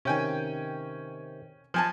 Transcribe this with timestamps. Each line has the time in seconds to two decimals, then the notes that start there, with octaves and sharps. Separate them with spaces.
0.05 C3 D#3 C#4 G5 G#5
1.74 F3 G#5 A5